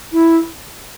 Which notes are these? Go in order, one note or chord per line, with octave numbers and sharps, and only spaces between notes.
E4